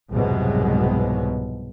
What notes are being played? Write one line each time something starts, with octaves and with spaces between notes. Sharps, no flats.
C2 F2 G#2 B2 F#3 G#3